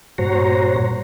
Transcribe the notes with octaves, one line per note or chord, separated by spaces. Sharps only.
G2 A#2 F#4 C5 C#5 A#5